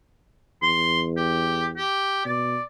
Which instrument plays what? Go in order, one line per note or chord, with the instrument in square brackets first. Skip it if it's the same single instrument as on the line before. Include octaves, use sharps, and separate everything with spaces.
[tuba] E2 [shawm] C6
[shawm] G4
G4
[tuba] B2 [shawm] D5